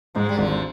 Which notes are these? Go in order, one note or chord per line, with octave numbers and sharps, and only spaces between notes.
G#2 F3 G#3
G3
G#1 D3 F3